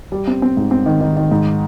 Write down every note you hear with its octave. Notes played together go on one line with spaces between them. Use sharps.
G3
C4
C4
G#2
C4
D#3
D#3
D#3
G#2